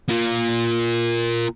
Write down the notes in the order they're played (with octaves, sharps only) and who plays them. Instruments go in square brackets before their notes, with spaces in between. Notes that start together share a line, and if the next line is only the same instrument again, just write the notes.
[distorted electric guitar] A#3 F4